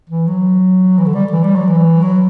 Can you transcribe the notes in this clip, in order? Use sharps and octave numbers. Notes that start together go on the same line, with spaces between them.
E3
F#3
E3
D3
G3
E3
G3
F#3
E3
F#3